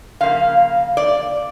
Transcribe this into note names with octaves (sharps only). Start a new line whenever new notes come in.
C#3 F3 A#3 F5
D5